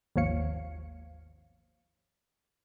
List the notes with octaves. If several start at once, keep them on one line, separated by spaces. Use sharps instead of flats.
G#1 D#2 F3 C#5 F5 C#7